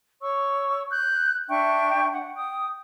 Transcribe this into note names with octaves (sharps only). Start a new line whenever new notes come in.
C#5 C#6 E6
F#6 G6
D4 E5 G5 C#6
F#5
G5 D#6